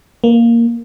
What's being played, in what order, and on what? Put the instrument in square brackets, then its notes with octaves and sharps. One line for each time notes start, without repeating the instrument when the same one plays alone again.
[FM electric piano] A#3